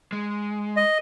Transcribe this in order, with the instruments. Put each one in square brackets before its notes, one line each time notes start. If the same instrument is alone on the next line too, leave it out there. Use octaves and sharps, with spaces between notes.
[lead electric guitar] G#3
[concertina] D#5